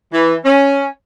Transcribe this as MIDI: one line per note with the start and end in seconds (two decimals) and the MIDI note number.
0.13 0.34 52
0.44 0.85 61